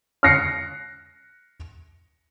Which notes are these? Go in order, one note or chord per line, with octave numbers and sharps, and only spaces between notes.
F6 F#6 A#6 C7 C#7